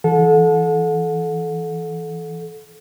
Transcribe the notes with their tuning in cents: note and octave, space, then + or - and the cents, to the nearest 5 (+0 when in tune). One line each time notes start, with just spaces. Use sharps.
E3 +0 A4 -25 F#5 -35